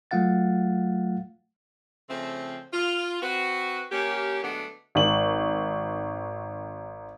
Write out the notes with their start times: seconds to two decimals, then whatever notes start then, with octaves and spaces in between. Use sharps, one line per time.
0.11 F#3 A3 F4 F5 F#5 A6
2.10 C#3 F3 A3 C4
2.73 F4
3.22 C4 F#4 B4
3.92 A#3 C#4 G4
4.43 D3 F#3 G#3 A3 B3 D4
4.95 G#1 F#7